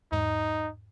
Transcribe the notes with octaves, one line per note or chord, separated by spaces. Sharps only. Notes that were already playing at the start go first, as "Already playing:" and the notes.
E2 G#2 D#4